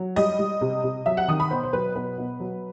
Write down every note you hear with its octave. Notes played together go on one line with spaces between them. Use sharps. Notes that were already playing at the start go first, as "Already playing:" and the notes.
Already playing: F#3
G3 D#5
G3
C3
C3
F#3 E5
F#5
D#3 D#6
B5
B2 C5
C5
F#3 B4
B2 B4
B2
F#3